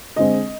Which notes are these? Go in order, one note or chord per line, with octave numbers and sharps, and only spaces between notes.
D3 G#3 C4 D#5